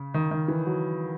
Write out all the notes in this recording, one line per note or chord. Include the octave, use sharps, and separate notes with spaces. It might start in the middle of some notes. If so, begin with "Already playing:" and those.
Already playing: C#3
D#3
D#3
E3
F#3